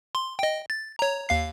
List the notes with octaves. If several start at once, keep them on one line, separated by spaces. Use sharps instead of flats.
C6
D#5 G5
A6
C#5 A#5
D#2 F5 C7